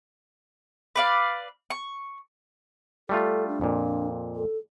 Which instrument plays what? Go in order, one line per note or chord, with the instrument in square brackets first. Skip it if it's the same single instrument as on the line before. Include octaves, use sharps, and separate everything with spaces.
[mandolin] B4 D5 F5
C#6
[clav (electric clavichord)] G3 A3 F4 [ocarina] A4
[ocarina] D4
[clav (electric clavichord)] F2 A#2
[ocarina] A4